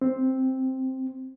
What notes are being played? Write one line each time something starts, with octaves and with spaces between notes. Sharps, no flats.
C4